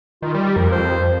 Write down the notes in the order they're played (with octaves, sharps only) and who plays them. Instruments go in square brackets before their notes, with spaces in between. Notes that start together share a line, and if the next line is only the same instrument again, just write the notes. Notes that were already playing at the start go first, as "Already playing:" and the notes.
[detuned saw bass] D#3 [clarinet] F4
[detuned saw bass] G3
[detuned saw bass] F2 [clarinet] A#4
[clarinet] C5